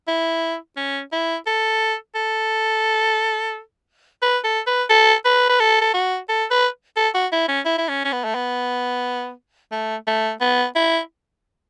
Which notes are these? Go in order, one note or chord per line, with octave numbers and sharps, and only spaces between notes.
E4
C#4
E4
A4
A4
B4
A4
B4
A4
B4
B4
A4
A4
F#4
A4
B4
A4
F#4
E4
C#4
E4
E4
C#4
C#4
B3
A3
B3
A3
A3
B3
E4